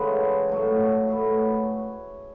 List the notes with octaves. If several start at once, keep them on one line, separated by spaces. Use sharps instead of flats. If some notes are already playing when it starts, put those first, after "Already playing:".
Already playing: C#3 E3 G#3 F#4 A4 B4 C#5
A2 F#3 A3
A2 F#3 A3 G#4 B4